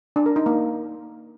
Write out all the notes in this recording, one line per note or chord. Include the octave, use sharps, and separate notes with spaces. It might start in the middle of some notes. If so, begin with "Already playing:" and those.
D4
A#4
D#4
A#3